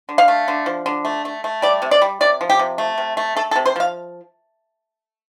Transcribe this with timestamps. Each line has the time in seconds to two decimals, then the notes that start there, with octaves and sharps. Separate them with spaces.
0.09 D3
0.18 F5
0.28 A3
0.48 D3
0.66 F3
0.86 D3
1.05 A3
1.25 A3
1.44 A3
1.62 G3 D5
1.82 C3
1.91 D5
2.02 G3
2.21 C3 D5
2.41 F3
2.50 G4
2.59 C3
2.78 A3
2.98 C3
3.17 A3
3.37 A3 A4
3.51 A4
3.56 C3
3.66 C5
3.76 F3 F5